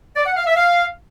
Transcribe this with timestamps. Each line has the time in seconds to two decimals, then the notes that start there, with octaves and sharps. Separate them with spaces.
0.16 D5
0.26 F#5
0.37 F5
0.47 E5
0.57 F5